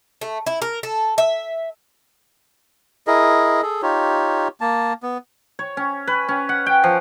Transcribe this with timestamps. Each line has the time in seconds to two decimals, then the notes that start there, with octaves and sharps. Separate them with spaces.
0.21 A3
0.46 E4
0.62 A#4
0.83 A4
1.18 E5
3.07 E4 G#4 A#4 D#5
3.63 G#4 A4
3.82 D#4 F4 G4 C#5
4.61 A#3 A5
5.03 B3
5.59 C#5
5.77 C#4
6.07 B4
6.29 C#4
6.49 F#5
6.66 G5
6.84 F3